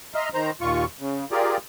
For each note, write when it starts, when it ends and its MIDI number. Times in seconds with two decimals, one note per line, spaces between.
0.15 0.29 75
0.15 0.29 76
0.15 0.29 82
0.15 0.29 84
0.15 0.29 89
0.34 0.51 51
0.34 0.51 72
0.34 0.51 82
0.61 0.85 39
0.61 0.85 46
0.61 0.85 65
0.61 0.85 85
1.00 1.25 49
1.31 1.57 65
1.31 1.57 67
1.31 1.57 68
1.31 1.57 70
1.31 1.57 74